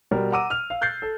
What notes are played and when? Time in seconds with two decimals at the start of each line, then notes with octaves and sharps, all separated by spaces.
0.11 B2 G3 A#4
0.32 F#5 A#5 D6 E6 D#7
0.50 F6 F7
0.70 F5
0.81 F#6 G6 A6 C7
1.02 A4